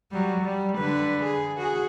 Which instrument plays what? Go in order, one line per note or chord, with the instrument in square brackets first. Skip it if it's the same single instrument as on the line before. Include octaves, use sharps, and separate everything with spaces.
[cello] F#3 G3
G3
D3 B4
G#4
F#4 G#4